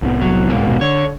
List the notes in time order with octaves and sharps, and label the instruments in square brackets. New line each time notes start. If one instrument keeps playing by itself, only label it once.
[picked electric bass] C2 A2 B3
[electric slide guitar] F#3
G#2 B2 A#3
[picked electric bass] D#1 B1
[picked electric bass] D3 [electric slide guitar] C#5